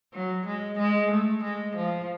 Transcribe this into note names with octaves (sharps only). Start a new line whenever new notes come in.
F#3
G#3
G#3
A3
G#3
F3